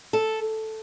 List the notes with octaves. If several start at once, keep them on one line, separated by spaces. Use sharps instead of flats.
A4